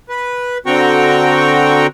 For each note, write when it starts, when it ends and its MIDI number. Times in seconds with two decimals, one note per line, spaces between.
0.09 0.58 71
0.66 1.87 50
0.66 1.87 60
0.66 1.87 66
0.66 1.87 79
0.66 1.87 82
0.66 1.87 85